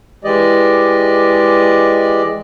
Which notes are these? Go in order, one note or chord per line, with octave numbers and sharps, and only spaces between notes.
E3 G#3 G4 D5 D#5